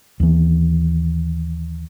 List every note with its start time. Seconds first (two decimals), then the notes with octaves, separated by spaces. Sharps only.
0.20 D#2 E3